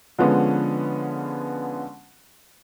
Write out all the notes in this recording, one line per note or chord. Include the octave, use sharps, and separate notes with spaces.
D3 F3 G#3 B3 C#4